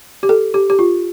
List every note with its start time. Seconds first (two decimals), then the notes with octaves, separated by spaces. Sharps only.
0.23 G4
0.29 A4
0.54 G4
0.70 G4
0.79 F4